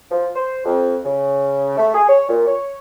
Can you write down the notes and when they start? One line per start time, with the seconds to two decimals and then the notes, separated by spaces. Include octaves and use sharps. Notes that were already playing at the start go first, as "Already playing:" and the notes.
0.11 F3
0.35 C5
0.65 F2
1.05 C#3
1.78 A3
1.94 G#4
2.09 C#5
2.29 A#2
2.46 C#5